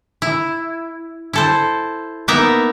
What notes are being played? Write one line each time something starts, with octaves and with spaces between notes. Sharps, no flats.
E4
E4 A4 C5
A#3 B3 D#4 A#4 E5